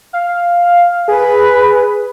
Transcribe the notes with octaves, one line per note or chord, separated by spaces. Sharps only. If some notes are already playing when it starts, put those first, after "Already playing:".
F5
G#4 B4